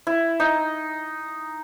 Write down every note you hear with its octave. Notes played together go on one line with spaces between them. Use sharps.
E4
D#4